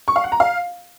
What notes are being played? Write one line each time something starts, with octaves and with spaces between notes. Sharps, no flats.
C#6
F5
F#5
A#5
F5